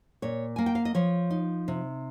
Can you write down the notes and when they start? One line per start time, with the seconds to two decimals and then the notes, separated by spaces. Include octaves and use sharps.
0.22 A#2 C#5
0.56 A#3 G#5
0.66 G5
0.75 F5
0.85 D#5
0.95 F3 C#5
1.30 D#4
1.68 C3